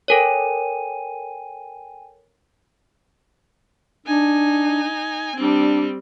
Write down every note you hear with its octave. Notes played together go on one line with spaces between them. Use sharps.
A4 A#4 C#5 G5 G#5 D#7
D4 D#4 G#5
G3 C4 D4